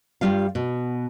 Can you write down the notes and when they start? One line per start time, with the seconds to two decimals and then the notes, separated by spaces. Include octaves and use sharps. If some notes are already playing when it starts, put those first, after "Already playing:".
0.21 G2 F3 G3 F4 F5
0.55 B2